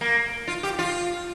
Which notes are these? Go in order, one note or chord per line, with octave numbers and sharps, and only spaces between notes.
A#3
F4
G4
F4